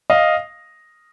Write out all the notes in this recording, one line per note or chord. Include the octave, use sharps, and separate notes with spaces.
D#5 F5